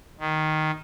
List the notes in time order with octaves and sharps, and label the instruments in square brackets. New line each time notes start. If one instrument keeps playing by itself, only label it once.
[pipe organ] D#3